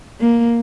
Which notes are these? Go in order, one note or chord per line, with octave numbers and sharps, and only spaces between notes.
A#3